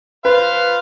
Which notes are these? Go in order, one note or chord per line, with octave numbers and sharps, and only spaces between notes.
B4 C5 F5